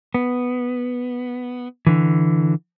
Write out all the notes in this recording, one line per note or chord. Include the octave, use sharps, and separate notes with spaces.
B3
D3 E3